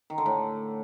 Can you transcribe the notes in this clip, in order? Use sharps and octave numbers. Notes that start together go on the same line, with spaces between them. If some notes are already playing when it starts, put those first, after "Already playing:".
D#3
D3
A2